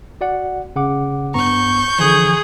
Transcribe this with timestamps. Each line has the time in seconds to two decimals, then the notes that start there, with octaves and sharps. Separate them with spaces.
0.21 F#4 D5 F#5
0.76 C#3 F#5 D6
1.34 G2 B3 A#5 C#6 G6
1.99 D3 E3 F3 G#4